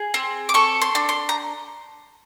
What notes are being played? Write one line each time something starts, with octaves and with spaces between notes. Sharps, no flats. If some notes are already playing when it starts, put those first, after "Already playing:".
Already playing: G#4
C4
D6
A4 C#6
C6
D4
C6
A#5